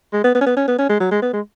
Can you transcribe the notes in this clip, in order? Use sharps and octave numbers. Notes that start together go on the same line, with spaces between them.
G#3
B3
B3
C#4
B3
C#4
B3
C#4
G#3
F#3
G#3
B3
G#3